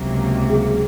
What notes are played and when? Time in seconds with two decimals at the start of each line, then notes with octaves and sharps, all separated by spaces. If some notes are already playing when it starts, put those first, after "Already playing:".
Already playing: C#2 C3 F#3 A#3
0.50 G#4